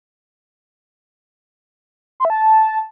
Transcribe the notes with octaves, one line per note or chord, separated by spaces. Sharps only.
C6
E5
A5